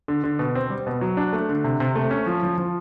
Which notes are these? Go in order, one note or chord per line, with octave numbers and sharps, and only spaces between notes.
D3
D3
B2
C4
G3
B2
F#3
D4
A3
D3
C3
C3
A3
C#4
F3
F3
F3